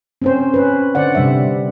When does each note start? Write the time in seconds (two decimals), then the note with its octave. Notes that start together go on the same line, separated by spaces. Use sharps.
0.22 C4 C#4 C5
0.54 C#4 B4
0.95 D3 C5 D5 F#5
1.15 C3 G3 E5